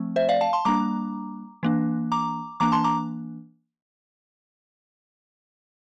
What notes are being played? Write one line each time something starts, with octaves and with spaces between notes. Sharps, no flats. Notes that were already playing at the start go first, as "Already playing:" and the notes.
Already playing: F3 A3 C4
C5 E5
D5 F5
F5 A5
A5 C6
G3 A#3 D4 A#5 D6
E3 A#3 D4
A#5 D6
E3 A#3 D4 A#5 D6
A5 C6
A#5 D6